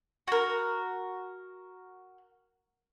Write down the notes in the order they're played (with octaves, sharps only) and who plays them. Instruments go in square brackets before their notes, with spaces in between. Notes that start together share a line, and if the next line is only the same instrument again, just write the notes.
[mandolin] F#4 A#4